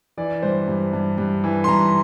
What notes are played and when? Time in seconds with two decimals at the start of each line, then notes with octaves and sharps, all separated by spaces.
0.17 E3 D5
0.42 G2 C5
0.68 G2
0.93 G2
1.18 G2
1.44 E3
1.64 C6
1.68 G2 A#5